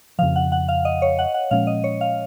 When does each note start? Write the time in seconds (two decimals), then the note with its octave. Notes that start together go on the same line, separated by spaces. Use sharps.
0.19 F3 F5
0.21 F2 C#3
0.36 F#5
0.52 F#5
0.68 F5
0.85 D#5
1.02 C#5
1.19 F#5
1.34 F#5
1.51 A#2 F3 G#3 C#4 F5
1.67 D#5
1.84 C#5
2.01 F5